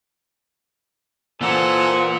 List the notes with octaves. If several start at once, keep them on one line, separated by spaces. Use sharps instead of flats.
A#2 E3 A4 C5 F#5 G#5